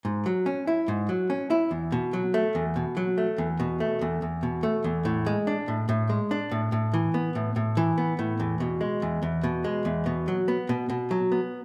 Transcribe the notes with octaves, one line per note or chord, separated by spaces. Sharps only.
G#2
F#3
C#4
E4
G#2
F#3
C#4
E4
E2
B2
F#3
A3
E2
B2
F#3
A3
E2
B2
A3
E2
E2
B2
A3
E2
A2
G#3
D4
A2
A2
G#3
D4
A2
A2
E3
B3
A2
A2
E3
B3
A2
E2
B2
G#3
E2
E2
B2
G#3
E2
B2
F#3
B3
B2
B2
F#3
B3